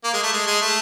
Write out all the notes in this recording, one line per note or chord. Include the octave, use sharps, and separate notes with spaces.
A#3
G#3
A3
G#3
G#3
A3